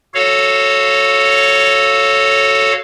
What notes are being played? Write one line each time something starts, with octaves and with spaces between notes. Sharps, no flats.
F#4 A4 C#5 F5